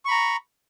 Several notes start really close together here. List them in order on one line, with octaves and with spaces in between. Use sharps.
C#6 B5 A#5